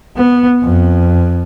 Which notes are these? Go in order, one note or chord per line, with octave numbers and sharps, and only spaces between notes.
B3
F2